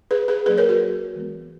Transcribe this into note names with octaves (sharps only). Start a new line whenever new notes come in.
G#4 B4
G#4 B4
F#3 A#3 C#4 G#4 B4
A#4 C#5
F#4 A#4
E3 G#3 B3